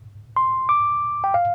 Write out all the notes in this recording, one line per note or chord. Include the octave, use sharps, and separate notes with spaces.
C6
D6
G5
F5